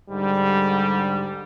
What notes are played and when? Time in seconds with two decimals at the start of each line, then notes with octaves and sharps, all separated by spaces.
0.10 G#2 D3 G3